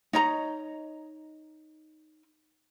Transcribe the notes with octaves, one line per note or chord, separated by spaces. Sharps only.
D#4 C#5 D#5 A#5